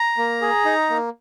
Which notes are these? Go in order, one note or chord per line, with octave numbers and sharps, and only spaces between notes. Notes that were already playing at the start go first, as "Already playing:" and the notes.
Already playing: A#5
A#3
G#4
D#4
A#3